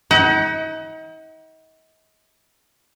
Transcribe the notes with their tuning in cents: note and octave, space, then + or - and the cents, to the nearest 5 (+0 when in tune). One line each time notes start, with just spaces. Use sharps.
D#4 +40 F#5 +40